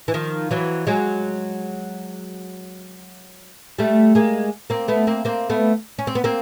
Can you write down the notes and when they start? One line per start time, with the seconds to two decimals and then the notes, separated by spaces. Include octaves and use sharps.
0.08 E3
0.14 D#3 F3
0.51 E3 F#3
0.87 F#3 G#3
3.79 G3 A3
4.15 G#3 A#3
4.70 A#3 C4
4.88 A3 B3
5.07 A#3 C4
5.25 A#3 C4
5.50 A3 B3
5.99 C#4
6.07 C4
6.15 B3
6.24 A#3 C4